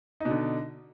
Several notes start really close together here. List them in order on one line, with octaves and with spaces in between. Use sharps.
D#4 B2 D3